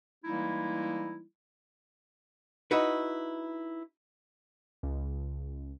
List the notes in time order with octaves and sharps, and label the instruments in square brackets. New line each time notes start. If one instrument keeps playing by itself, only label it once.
[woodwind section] E3 G3 G#3 A#3 D#4 E4
[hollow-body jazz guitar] D#4 E4 F#4 B4
[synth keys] C#2